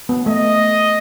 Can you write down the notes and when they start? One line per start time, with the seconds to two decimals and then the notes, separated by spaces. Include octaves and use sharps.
0.09 B3
0.26 A3 D#5